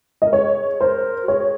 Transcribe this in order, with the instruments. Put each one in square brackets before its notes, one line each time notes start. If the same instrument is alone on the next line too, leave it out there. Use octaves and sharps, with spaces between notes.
[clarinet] A#4 [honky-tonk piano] D#5
[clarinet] G#4 [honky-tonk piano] C#5
[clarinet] A#4 [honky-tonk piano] C5
[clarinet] F#4
[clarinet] G#4 [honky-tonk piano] C#5